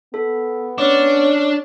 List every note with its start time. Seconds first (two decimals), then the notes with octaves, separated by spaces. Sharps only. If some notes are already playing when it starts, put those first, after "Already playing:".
0.14 B3 A4
0.78 C#4 D4 D6